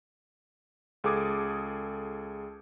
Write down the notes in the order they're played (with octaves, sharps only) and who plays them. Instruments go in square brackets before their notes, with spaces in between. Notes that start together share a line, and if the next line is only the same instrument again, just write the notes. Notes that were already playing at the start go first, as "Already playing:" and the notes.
[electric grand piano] C#2 G#4 A4 D6 D#6 G#6